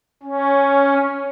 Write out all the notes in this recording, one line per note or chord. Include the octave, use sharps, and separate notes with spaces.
C#4